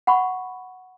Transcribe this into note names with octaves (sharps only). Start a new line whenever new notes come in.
F#5 B5 C#6